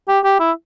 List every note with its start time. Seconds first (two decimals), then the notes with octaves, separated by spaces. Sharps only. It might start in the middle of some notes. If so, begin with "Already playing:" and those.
0.08 G4
0.24 G4
0.40 E4